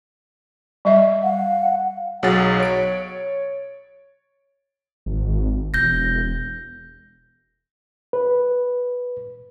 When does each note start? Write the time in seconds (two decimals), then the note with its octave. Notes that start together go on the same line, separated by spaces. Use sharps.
0.85 G3 D#5 E5
1.23 F5 F#5
2.23 B1 F#3 G#4 F#5 A6
2.60 C#5 D7
5.06 G#1
5.74 E1 G6 A#6
8.13 B4